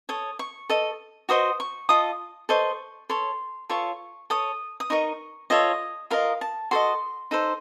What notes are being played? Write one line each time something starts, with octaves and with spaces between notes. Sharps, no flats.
A4 C#5 D#6
C#6
A4 D#5
F#4 C5 D#5 D#6
C#6
F4 A4 D#5 D#6
A4 C5 D#5 C#6
A4 C#5 C6
F4 A4 C#5 C#6
A4 C#5 D#6
D#6
D#4 A#4 D#5 C#6
F4 A4 C#5 D#5
F4 A#4 D#5 F5
A5
F#4 A4 D#5 C6
D#4 A4 C5